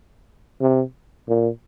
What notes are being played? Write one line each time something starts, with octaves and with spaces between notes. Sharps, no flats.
C3
A#2